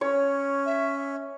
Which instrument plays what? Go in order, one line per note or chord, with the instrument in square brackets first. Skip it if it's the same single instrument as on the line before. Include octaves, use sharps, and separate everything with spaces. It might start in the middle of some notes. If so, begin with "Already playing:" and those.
[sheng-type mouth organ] C#4 [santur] C#5
[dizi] E5